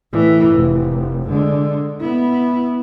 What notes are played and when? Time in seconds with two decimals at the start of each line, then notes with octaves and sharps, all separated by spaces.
0.12 A2 E3
0.55 F1
1.27 D3 G#3
2.00 B3 E4